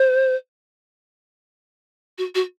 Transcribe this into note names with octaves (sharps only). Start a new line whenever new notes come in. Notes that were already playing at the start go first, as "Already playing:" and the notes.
Already playing: C5
F#4
F#4